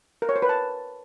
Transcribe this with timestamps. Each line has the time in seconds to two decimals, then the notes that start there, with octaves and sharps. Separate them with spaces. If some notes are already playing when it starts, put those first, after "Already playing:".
0.22 A#4
0.29 C#5
0.36 C5
0.42 B4
0.49 A5